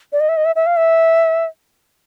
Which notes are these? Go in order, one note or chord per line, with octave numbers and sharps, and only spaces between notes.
D5
D#5
E5
D#5
E5
E5
F5
E5